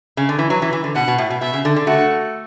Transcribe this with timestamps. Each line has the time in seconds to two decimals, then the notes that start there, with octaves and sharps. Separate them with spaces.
0.17 C#3
0.29 D3
0.39 E3
0.50 F#3 B4
0.62 E3
0.73 E3
0.84 D3
0.95 B2 F#5
1.08 B2
1.18 A2
1.30 B2
1.41 B2 E5
1.54 C#3
1.65 D3
1.76 D3
1.87 A3 F#4